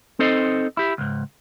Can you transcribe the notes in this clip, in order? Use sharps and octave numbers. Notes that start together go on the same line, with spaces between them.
C4 D#4 A4 C5 D#5
E4 G4
C#2 G#2